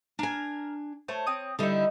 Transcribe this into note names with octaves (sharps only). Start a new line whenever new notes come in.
D4 A#4 G#5
A3 C5 C#5 C6
C4 D#6
D3 G3 D#4 E4 D#5